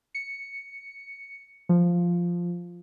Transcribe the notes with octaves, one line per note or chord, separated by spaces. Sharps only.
C#7
F3